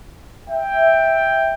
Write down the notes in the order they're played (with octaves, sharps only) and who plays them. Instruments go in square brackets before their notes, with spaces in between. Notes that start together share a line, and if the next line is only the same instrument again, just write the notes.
[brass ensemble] E5 G5